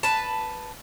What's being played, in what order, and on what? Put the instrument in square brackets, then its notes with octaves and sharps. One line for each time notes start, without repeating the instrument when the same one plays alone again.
[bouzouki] B4 A5